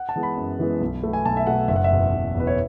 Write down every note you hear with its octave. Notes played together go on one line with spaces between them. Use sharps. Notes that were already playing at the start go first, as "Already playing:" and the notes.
Already playing: F#5
A5
E3 G#3 B3
B5
F#2
E3 G#3 B3
B1
B2 A3
G#5
B1 A5
E5
B2 A3 F#5
F#1 E5
F#5
E5
E2 B2
F#1
E2 B2 B4
C#5